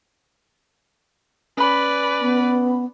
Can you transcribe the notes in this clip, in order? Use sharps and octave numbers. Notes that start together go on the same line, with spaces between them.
C#4 B4 D5 B5
B3